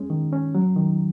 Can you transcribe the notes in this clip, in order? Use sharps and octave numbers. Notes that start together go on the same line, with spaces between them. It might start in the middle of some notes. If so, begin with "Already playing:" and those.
Already playing: G#3 C#4
D#3
C#4
F#3
D#3